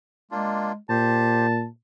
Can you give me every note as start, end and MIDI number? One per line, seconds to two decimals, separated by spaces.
0.31 0.77 56
0.31 0.72 58
0.31 0.72 62
0.31 0.72 65
0.90 1.66 46
0.90 1.47 67
0.90 1.47 72
0.90 1.65 81